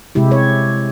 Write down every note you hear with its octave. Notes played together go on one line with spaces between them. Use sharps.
C3 G#3 E4 G4
G4 C#5